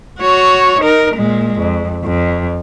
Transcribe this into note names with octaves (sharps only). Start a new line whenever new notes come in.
F#4 C#5
D#4 A#4
A#2 G#3
F2
F2